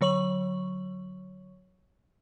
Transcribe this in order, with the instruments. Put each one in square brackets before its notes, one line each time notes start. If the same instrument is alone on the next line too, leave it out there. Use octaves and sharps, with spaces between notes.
[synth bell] D3 F#3 C#5 C#6 F#7